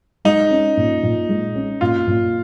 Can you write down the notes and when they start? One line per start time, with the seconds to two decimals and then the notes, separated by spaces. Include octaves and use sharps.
0.25 G#3 D#4
0.51 C#4
0.77 A#2
1.03 A#2
1.29 G#3
1.55 C#4
1.81 A#2 F4
2.07 A#2